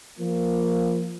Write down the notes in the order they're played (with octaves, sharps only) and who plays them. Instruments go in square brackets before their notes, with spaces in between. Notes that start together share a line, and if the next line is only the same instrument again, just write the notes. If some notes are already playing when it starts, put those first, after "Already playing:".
[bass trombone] F3 [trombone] A#3